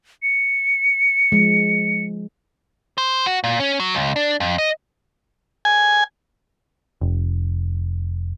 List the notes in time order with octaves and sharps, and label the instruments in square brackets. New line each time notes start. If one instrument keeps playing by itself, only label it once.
[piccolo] C#7
[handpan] F3 G#3
[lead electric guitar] C5
F#4
A#2
C#4
F#3
C#2
D4
F2
D#5
[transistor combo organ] G#5
[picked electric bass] F1